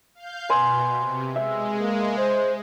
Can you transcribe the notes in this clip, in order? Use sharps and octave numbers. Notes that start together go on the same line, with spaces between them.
F5 G6
B2 B4 G#5 C6
C3
G#3 E5
A#3
C5